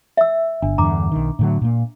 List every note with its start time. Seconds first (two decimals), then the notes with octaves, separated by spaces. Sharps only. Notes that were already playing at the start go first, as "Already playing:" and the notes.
0.17 E5 E6
0.62 G1 D4
0.78 E2 G2 D3 A#5 D6
1.12 B1 D#3
1.39 A2 D3 F#3
1.62 A#2 A#3